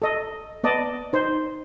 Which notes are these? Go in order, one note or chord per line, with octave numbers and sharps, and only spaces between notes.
A4 D#5
B3 D5 D#5 A5
D#4 C5